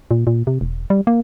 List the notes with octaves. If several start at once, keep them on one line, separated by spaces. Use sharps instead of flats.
A#2
A#2
C3
E1
G3
A#3